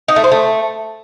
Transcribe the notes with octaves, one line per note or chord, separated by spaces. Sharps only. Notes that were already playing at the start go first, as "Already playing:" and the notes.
D#4
A3
C5
A3